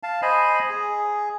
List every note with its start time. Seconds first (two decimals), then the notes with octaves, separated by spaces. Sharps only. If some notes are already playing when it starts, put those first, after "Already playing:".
0.03 F5 A5
0.22 C5 D#5 G#5 B5
0.70 G#4